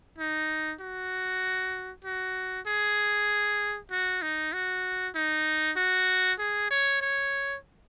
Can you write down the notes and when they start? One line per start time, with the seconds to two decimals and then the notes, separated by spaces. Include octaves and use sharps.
0.19 D#4
0.80 F#4
2.05 F#4
2.67 G#4
3.91 F#4
4.22 D#4
4.53 F#4
5.15 D#4
5.77 F#4
6.39 G#4
6.71 C#5
7.01 C#5